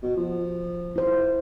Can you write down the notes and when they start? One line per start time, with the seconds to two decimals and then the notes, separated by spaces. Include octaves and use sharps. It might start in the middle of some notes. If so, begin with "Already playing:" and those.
0.03 B2
0.16 F3
0.96 E4 C5